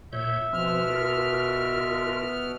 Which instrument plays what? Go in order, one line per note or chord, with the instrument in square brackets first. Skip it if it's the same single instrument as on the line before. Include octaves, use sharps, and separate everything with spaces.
[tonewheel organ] A#2 C#5 G6 [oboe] E5
[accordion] B2 F6 [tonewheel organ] F3 C4
[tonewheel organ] F4 A#4